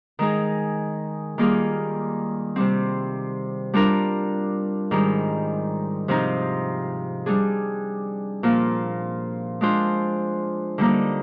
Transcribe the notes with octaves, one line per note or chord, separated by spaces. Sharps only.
D#3 G#3 D#4 G#4
D#3 G3 A#3 F4 G#4
C3 G3 C4
G3 D4 F4 A#4
G#2 D#3 G3
C3 F3 C4 D#4
G3 D4 G#4
A#2 F3 A#3
G#3 D4 F4 C5
D3 G3 A#3 D#4